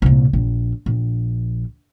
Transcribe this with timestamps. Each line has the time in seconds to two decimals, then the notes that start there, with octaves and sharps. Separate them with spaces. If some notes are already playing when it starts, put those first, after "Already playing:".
0.02 C2 A#2
0.33 A#1
0.86 A#1